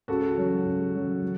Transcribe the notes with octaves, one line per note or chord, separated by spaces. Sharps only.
C#2 F#4 A4
C#3 F#3 C#4
C#2
C#3 F#3 C#4
F#3